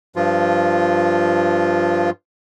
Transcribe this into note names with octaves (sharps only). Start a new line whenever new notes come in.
G2 F3 F4